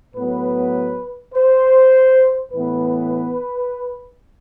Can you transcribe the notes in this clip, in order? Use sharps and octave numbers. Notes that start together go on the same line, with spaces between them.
A2 F#3 B3 B4
C5
A2 E3 B3 B4